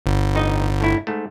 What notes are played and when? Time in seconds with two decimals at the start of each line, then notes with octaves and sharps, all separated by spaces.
0.06 G1
0.35 A1 D#4 D#5
0.81 A2 E4
1.07 G#2 A3